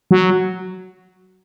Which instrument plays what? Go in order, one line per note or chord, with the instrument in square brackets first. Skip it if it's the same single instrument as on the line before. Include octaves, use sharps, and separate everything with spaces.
[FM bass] F#3